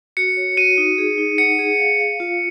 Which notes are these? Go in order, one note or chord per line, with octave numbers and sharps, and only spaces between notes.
F#4 C#7
C#5
F#4 D#7
D#4
G#4
D#4
F#5 C#7
G#4
F5
F5
F4